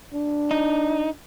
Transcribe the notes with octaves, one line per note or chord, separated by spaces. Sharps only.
D4
D#4